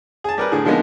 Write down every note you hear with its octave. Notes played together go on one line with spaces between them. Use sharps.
G#4 A5
G3 A#4 B4
A2 D3 G#4
D3 F3 G#3 A#3 B3 D#4